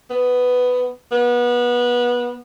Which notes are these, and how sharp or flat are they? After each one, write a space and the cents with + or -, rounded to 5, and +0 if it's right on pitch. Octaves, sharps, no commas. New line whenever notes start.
B3 +10
B3 -25